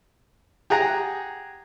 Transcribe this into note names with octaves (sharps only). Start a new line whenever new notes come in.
G4 G#4 F#5 A#5